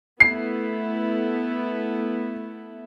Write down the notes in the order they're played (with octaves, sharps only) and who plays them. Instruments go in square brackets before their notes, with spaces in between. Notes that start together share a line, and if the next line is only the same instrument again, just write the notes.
[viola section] A3 B3 E4 [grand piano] C7